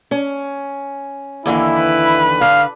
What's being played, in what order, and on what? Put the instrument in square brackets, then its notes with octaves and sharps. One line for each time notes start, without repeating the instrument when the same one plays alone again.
[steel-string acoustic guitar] C#4
[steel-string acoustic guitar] D#2 D3 E3 [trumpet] E4
[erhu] B4
[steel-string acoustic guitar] D3 [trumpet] F5